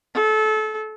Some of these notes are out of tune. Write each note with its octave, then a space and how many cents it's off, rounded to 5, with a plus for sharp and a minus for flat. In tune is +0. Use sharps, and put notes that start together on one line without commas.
A4 -30